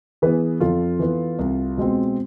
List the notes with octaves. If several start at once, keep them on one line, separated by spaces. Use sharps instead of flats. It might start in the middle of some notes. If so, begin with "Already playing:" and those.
E3 B3 G#4 B4
F2 F4 A4
E3 B3
C2
B2 G#3 C4